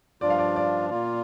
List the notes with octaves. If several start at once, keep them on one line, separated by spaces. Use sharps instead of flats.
G2 F3 D4 F4 D5
F5
D5
D5
A#2 A#3 F4